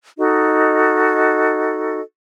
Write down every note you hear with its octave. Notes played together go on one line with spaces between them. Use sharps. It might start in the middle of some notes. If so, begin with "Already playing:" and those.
D#4 F#4 A4 D#5